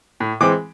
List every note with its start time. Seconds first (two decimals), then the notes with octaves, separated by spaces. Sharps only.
0.20 A2
0.40 E3 G#3 C4 D6